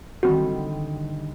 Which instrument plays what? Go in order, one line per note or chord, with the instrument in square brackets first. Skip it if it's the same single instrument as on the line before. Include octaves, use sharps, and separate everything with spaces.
[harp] D3 D#3 G3 [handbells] C4 F#4